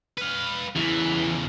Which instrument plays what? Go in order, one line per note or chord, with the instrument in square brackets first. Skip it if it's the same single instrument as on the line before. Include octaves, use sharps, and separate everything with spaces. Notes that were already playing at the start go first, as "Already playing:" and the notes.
[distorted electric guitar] B4 F5
[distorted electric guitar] E2 C#3 [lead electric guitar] E3